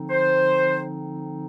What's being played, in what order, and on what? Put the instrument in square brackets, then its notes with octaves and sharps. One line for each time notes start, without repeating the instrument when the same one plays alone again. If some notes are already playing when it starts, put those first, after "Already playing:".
Already playing: [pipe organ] D3 F3 C4 D#4
[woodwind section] C5